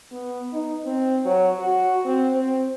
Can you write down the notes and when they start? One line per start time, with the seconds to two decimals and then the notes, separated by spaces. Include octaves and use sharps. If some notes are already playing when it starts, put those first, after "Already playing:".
0.12 B3
0.53 D#4
0.85 C4
1.25 F#3
1.60 F#4
2.06 C4
2.35 C4